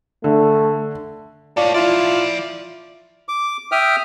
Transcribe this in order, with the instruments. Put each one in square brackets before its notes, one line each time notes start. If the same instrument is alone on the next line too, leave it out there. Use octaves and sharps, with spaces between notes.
[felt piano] D3 [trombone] A3
[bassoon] F4 [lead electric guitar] A4 C#5 [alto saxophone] D5
[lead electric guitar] F3 D5 [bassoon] E4 [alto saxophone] F4
[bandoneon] D6
E5 G5 D#6 F6